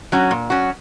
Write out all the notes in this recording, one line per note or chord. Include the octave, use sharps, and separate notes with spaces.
F#3 C#4 F#4
A#2
F#3 C#4 F#4